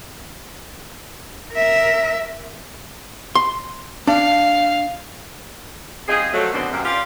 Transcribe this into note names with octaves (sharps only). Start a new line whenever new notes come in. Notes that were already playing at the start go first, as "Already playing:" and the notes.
A#4 E5
C6
D4 F5
G3 C4 D#4 F4 G#4
F3 F#3 A3
F#2 B2 D3 D#3 C4 D4
F#2 C3 A#3
C#4 F4 G4 B4 D5